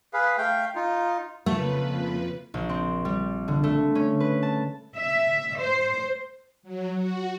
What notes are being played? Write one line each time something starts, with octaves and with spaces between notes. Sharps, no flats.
G#4 B4 F5
A3 F5 G5
D#4 F4
F2 C#3 F3 A3 A#3 B4
A#1
C4
G3
D3
A3
C#4
B4
A5
E5
C5
F#3
F#4